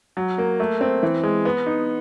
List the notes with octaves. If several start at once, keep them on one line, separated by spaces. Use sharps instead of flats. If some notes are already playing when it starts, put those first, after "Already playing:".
F#3
A#3
A3
C4
E3
G#3
B3
D#4